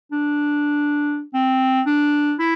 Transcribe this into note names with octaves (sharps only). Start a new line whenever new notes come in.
D4
C4
D4
E4